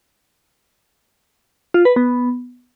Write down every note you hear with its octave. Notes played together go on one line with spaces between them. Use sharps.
F4
B4
B3